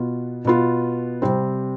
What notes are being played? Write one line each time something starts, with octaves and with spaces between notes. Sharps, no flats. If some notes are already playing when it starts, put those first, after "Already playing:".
Already playing: B2 B3 F4
B2 B3 F4
C3 G3 C4